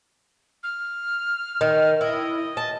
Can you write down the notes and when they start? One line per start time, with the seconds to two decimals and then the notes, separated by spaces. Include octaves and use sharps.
0.63 F6
1.61 D#3
2.01 E4 D#5
2.57 A5